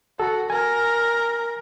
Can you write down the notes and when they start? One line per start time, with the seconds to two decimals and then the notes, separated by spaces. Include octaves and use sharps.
0.20 F#4 A4
0.50 A#4 G#5